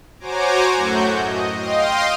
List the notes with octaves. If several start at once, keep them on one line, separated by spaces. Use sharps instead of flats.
F#4 C5 C#5 G#5 A#5 D6
F#2 A2 A3 F#4 G6
D#5
D#5 F5 G5 C6